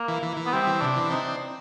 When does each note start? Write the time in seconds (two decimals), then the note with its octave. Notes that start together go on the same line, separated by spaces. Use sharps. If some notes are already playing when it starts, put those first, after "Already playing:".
Already playing: A#3
0.08 E3
0.23 E3
0.37 E3
0.46 B3
0.52 G3 C4
0.67 E3
0.81 C3 D4
0.96 E3
1.10 C4 D#4